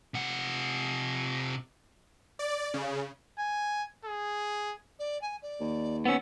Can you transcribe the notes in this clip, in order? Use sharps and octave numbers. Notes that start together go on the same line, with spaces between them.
C3 F#5
D5
C#3
G#5
G#4
D5
G#5
D5
D#2
B3 C#4 E6